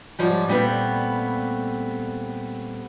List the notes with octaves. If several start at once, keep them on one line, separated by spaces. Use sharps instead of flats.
G#2 F3 G3 C#5
A#2 G3 A3 B3 C4